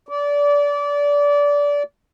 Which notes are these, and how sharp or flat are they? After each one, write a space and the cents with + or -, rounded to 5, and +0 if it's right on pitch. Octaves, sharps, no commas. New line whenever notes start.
D5 -25